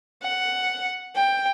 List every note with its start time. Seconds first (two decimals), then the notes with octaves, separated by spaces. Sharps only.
0.23 F#5
1.15 G5